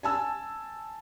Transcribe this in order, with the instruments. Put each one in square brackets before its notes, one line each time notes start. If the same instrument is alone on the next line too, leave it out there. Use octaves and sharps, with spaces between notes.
[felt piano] G#5 A5 E6